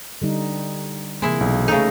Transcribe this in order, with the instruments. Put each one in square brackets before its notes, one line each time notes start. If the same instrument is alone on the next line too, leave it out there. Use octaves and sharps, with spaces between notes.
[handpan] D3 G3 D#4
[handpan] C3 E3 A#3 [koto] G#3 E4
[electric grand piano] B1
[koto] C#3 D#4 [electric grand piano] A3 A4